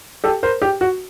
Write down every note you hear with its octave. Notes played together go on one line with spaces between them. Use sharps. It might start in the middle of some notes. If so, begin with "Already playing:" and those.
G4 A4
A#4 C5
G4
F#4